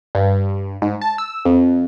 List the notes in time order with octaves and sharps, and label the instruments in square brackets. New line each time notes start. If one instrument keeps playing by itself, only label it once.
[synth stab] G2
G#2
A5
E6
F2